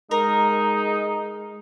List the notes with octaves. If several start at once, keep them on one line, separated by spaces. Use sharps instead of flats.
G#3 D#4 A#4